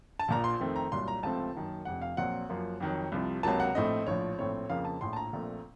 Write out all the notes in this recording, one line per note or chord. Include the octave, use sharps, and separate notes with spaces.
A5
A#1 A#2 F3 A#5
C6
F2 D#3 A3 C4
A#5
C2 A#2 F#3 C6
A#5
C#2 C3 F3 A3 C4 A5
F#2 D#3 A#3
F1 F2 C3 F#5
F5
A#1 A#2 F#3 C4 F#5
F#2 F3 A#3
F2 D#3 F#3
C2 C3 F3
C#2 C3 F#3 A#3 A5
F#5
A#1 A2 A3 C4 D#5
A#1 A2 F3 C#5
A#1 A2 A3 C4 C#5
F2 C#3 F3 A#3 F5
A5
A#1 A2 F3 C6
A5
A#5
A#1 A#2 A3 C4